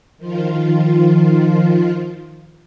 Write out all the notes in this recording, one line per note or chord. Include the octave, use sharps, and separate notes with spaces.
D#3 F3 F4